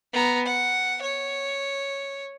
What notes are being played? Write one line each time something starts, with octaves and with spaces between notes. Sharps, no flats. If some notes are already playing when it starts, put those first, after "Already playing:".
B3 A#5
F#5
C#5